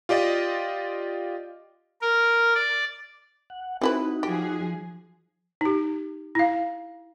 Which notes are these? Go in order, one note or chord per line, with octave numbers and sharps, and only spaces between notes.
F4 G4 D5 D#5
A#4
D5
F#5
C4 D#4 E4 F#4 B4
F3 G4 G#4
D#4 G4
E4 F5